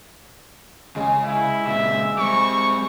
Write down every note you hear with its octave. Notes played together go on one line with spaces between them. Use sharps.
C#3 G#3 G#4
E4
A#2 C#3 E5
G3 C4 C#6